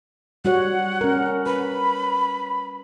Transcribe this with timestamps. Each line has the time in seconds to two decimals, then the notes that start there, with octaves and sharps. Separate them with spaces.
0.45 G3 F#4 C#5 F#5
1.01 C#4 A#4
1.46 B4 B5